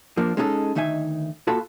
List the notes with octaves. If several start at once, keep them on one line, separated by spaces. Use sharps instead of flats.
F3 A#3 D4
G#3 C#4 D#4 G4 A4
D2 D#3 D#4 E5 G#5
A#2 F4 F#4 A4 A5 B5